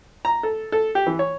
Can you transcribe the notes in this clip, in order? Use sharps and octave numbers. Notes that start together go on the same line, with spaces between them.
A#5
A4
A4
G4
E3
C#5